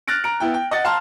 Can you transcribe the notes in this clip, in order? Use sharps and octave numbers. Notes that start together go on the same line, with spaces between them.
F6 F#6 A6 A#6 D7
A#5 D7
B3 E4 G5
G5
D#5 F#5 A6
F5 A5 A#5 C6 F6